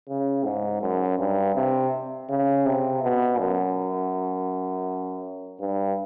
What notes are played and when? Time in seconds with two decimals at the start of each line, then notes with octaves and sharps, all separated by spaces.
0.09 C#3
0.45 G#2
0.82 F#2
1.19 G2
1.56 C3
2.29 C#3
2.66 C3
3.03 B2
3.39 F#2
5.60 G2